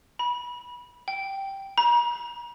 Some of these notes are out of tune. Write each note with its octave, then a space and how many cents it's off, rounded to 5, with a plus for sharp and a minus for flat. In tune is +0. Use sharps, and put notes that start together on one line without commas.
B5 -25
G5 -5
A#5 +45